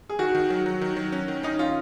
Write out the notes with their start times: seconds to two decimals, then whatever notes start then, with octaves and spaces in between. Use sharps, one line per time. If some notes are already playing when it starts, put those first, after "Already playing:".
0.09 G#4
0.19 D#3 F#4
0.35 D#3
0.50 F#3
0.66 F#3
0.81 D#3
0.97 F#3
1.12 C#4
1.28 D#3
1.43 C#4 D#4
1.59 C#4 F4